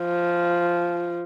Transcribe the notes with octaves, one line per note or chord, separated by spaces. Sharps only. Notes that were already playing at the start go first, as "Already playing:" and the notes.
Already playing: F3